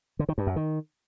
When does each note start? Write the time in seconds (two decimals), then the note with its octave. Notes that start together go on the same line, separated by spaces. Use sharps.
0.19 D3
0.29 D#3
0.38 G2
0.47 F#2
0.56 D#3